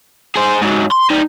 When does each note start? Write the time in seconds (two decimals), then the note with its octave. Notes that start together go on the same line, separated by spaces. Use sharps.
0.36 G#4 C5
0.62 G#2 F#3
0.92 C6
1.10 G3 D#4